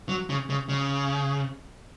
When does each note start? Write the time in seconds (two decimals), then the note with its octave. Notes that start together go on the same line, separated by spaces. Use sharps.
0.09 F#3
0.30 C#3
0.50 C#3
0.69 C#3